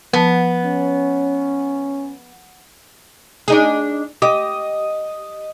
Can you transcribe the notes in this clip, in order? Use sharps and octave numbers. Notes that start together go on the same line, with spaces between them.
F3 B3 F#5 A5
C#4
D4 D#4 G#4
G4 D#5